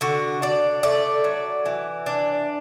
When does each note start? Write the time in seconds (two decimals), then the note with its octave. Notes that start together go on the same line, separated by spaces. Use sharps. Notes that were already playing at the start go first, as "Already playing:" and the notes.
0.01 D3 F#4
0.42 D4 D5
0.83 A3 D5
1.24 F#3
1.66 E3
2.06 D4